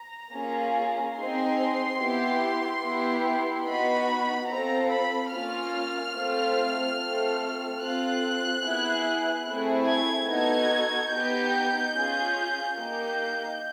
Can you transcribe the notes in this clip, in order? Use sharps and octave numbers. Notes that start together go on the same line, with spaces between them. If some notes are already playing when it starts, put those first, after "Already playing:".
Already playing: A#5
A#3 C#4 F4 G#4
C4 D#4 G#4 C6
B3 E4 G4
B3 E4 G4
B3 D#4 F#4 B5
C4 F4 A4 A#5
B5
A#3 C#4 F4 F6
A3 C4 F4 A4
A3 C4 F4 A4
C4 F4 A4 F#6
B3 E4 G#4
A3 C4 E4 G#4
G#6
B3 D#4 F#4 A4 G#6
B3 D#4 G4 G6
C#4 F4 G#4
A#3 D#4 G4 G6